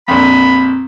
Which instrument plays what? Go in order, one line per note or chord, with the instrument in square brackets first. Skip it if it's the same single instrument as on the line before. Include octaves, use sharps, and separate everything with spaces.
[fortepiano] A#1 F2 [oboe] B5